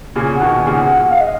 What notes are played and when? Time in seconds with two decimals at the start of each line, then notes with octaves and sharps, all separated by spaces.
0.16 A#2 C#3 G#5
0.35 F#5
0.41 B2 D#3
0.54 G#5
0.66 A#2 C#3
0.73 F#5
0.92 F#5
1.10 F5
1.21 D#5